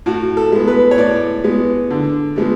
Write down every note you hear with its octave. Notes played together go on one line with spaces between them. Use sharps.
A2 F#4
A4
G#3 B3
B4
C#5
A2 D5
G#3 B3
D3
F3 G#3 B3